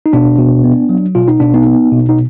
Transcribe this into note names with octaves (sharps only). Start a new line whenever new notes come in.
D#4
B2 D4
B2
B3
F#3
B2 F4
D#4
B2 D4
B3 D#4
B3
B2
D#4